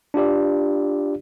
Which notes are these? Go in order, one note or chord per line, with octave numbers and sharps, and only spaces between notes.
D4 F4 G4 D5